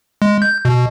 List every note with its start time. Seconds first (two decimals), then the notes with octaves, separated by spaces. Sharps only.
0.22 G#3
0.42 G6
0.65 B2